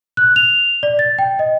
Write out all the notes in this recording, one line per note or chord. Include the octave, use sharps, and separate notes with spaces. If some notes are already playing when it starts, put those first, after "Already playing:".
F#6
F7
D5
A6
G5
D#5